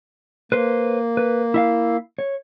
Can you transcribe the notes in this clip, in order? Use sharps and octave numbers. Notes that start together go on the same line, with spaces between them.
A#3 B4 C5
B4
E4 E5 F5
C#5